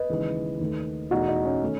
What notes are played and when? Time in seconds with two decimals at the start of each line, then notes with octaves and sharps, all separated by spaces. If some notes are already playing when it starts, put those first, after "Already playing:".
Already playing: B4 D#5
0.10 D#2 C#3 E3 G#3
0.60 D#2 D#3 A3
1.11 E2 B2 A3 D#4 F#4
1.28 D#4
1.45 C#4
1.63 D#3 A3